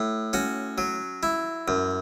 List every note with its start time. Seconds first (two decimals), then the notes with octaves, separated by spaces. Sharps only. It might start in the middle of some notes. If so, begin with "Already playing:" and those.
Already playing: A2
0.33 C#4 F#4
0.78 F#3
1.23 E4
1.68 F#2